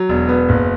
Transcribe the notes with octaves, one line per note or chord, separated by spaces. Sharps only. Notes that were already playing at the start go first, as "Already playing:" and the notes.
Already playing: F#3
E1
B3
F#1